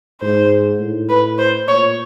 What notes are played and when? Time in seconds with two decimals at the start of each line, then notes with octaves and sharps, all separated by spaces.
0.22 G#2 C5
0.80 A2
1.10 B4
1.38 C5
1.68 A#2 C#5